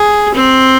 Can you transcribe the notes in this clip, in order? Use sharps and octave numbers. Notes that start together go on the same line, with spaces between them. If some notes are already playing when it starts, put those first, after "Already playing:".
Already playing: G#4
C4